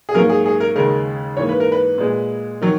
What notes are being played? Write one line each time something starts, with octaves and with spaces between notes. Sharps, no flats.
G#4
G#2 F#3 A#3 A#4
G#4
G#4
A#4
D#2 C#3 G#3 A#4
G#2 E3 A#3 C#5
B4
A#4
B4
A#2 G#3
D#3 F#3